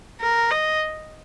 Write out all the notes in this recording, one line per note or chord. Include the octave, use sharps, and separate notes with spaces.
A#4
D#5